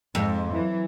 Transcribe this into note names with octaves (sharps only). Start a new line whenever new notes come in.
F2 G#2
E3 F#3